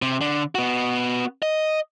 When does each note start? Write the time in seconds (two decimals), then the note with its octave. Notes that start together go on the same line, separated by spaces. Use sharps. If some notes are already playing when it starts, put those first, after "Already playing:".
0.02 C3
0.21 D3
0.55 B3 F#4
1.42 D#5